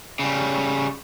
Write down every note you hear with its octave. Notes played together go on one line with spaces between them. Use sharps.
C#3 G3